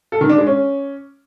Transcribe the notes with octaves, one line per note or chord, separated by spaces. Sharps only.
A4
D#3
D4
G#3
C#4